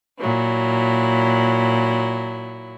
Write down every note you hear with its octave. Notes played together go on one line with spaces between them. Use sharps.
A#2 F#3 E4